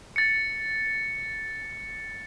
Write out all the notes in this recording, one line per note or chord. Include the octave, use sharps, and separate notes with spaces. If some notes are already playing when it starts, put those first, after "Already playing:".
A6 C#7